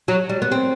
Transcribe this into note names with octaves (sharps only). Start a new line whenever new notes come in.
F#3
G3
B3
C4